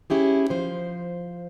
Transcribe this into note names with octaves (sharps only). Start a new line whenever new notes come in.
C#4 E4 G4 G#4
F3 C5